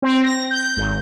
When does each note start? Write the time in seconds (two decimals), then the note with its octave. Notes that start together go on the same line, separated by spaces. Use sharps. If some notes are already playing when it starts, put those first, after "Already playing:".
0.02 C4
0.24 A#6
0.51 G6
0.77 G#1